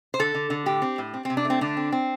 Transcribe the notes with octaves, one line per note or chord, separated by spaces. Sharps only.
C5
D3 A4
D3
D3
A2 G4
C4
A2
C4
C4
C3
D4
A3
C4
D3 D4
C4
C4